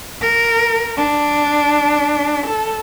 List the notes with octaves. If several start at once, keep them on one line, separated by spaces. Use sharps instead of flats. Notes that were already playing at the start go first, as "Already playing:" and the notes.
A#4
D4
A4